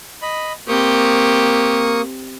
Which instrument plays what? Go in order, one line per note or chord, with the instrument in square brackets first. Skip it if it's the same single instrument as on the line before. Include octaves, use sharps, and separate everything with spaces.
[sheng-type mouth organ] D#5 B5
[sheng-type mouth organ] A#3 C#6 D#6 [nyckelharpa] C4 G4